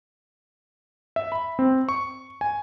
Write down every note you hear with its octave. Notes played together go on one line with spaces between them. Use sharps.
E5
B5
C4
C#6
G#5